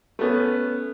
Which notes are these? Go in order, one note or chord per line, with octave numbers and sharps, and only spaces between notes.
A3 B3 C#4